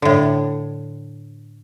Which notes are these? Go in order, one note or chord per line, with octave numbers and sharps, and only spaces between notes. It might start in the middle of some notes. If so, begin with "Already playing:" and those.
A2 D3